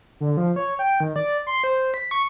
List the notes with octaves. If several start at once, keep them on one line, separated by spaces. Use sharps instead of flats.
D3
F3
C#5
G5
D#3
D5
C6
C5
B6
C#6